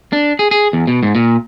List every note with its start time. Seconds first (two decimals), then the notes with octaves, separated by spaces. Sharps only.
0.13 D4
0.39 G#4
0.51 G#4
0.73 E2
0.87 B2
1.03 G#2
1.15 A#2